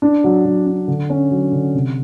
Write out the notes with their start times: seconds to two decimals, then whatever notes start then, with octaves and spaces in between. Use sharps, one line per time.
0.02 D4
0.24 F#3
0.45 F#3
0.67 D4
0.88 D3
1.10 C#4
1.31 F#3
1.52 D3
1.74 C3